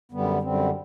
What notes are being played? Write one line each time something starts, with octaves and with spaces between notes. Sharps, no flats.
F#2 D3 G3 B3
F#2 D3 G3 C4